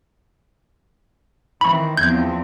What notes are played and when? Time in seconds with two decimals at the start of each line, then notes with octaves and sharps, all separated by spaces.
1.61 D#3 E3 C4 B5 C#6
1.97 E2 F3 C4 G6 G#6